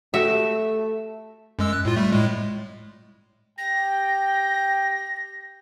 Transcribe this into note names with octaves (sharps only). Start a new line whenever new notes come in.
A3 F#4 G4 E5
F#2 G#3 E6
F#6
A2 F4
G3 A3
A2 G#3
G4 G5 A#6